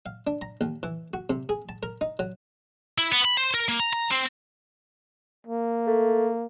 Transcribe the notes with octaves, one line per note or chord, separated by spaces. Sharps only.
F5
D4
A#5
D#2
E3
F#4
C3
G#4
A5
A#4
D#4
F#3
E4
B3
B5
C5
A#4
A#3
A#5
A#5
C4
A#3
A3